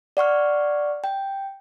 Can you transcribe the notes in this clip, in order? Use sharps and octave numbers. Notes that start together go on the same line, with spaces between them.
D5 F#5 C#6 F6
G5